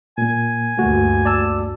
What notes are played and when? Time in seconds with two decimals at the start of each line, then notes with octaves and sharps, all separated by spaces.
0.18 A#2 A#3 G#5
0.77 D2 G2 A3 A#3 F#4
1.25 D5 A5 E6